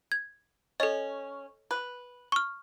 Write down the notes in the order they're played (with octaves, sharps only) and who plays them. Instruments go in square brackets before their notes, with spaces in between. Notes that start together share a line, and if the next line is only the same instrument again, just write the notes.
[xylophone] G#6
[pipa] C#4 [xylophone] A4 D#5
[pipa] B4
[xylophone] C#6 F6